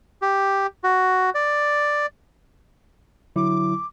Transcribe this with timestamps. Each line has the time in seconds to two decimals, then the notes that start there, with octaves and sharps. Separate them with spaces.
0.22 G4
0.84 F#4
1.35 D5
3.36 D3 F#3 E4 D6